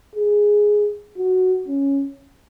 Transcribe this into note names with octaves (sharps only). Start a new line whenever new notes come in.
G#4
F#4
C#4